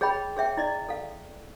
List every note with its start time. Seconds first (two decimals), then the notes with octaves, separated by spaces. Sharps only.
0.01 G#4 C#5 D#5 G5 B5
0.37 G#4 C#5 E5 G5
0.57 E4 D5 D#5
0.89 A4 F5